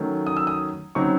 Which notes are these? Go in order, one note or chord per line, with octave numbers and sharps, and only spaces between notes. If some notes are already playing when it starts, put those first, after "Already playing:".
Already playing: D#3 F#3 A3 C#4
D#6
E6
D#6
C#3 F#3 C4 D#4 C#6